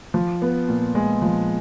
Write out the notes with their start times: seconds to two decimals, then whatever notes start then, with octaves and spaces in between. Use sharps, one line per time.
0.14 F3
0.42 B3
0.69 A#2
0.95 G#3
1.22 F3